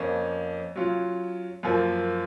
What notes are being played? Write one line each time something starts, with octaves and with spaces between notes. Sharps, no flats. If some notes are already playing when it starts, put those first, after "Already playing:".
Already playing: F2 F3 A#3 C#4
F#3 C#4 F4
F#2 F3 A#3